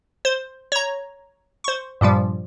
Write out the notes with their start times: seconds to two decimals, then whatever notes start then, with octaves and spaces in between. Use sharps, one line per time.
0.25 C5
0.72 C#5 A#5
1.64 C5 C#6
2.01 G2 A#2 F3 G3